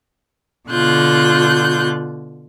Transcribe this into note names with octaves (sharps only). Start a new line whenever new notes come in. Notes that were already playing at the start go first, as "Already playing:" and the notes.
B2 D3 F4 F#6 G6